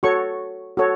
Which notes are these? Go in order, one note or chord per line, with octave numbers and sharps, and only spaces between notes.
F#4 A4 C#5 C#6
F#4 A4 C#5